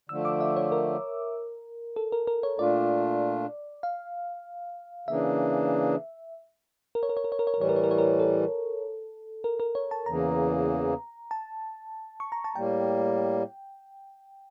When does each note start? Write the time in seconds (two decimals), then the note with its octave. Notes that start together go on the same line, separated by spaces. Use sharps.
0.09 D3 F3 A3 E6
0.25 D6
0.41 E5
0.57 C#5
0.72 A#4
1.96 A4
2.12 A#4
2.27 A#4
2.43 C#5
2.58 A#2 A3 D4 F4 D5
3.83 F5
5.08 C#3 E3 A#3 D4 E5
6.95 A#4
7.03 C#5
7.09 A#4
7.17 C#5
7.24 A#4
7.32 C#5
7.39 A#4
7.47 C#5
7.54 A#4
7.57 A2 E3 G3 C#5
7.69 A#4
7.76 C#5
7.84 A#4
7.91 C#5
7.98 A#4
8.20 A4
9.44 A#4
9.60 A#4
9.75 C#5
9.91 A5
10.06 E2 C#3 E3 A#3 A#5
11.31 A5
12.20 C#6
12.32 A#5
12.44 A5
12.55 A2 G3 A#3 G5